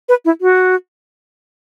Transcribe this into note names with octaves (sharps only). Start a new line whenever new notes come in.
B4
E4
F#4